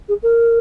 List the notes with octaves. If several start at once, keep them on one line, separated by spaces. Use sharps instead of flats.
G#4
A#4